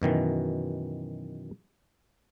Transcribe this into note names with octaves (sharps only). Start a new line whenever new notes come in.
F#2 B2 D#3 E3